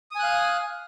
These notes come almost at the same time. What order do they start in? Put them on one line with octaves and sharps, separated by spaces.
D#6 G#5 F#6 F5